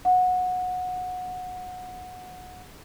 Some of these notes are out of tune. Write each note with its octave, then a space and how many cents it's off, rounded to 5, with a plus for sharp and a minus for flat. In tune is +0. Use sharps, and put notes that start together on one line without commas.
F#5 -20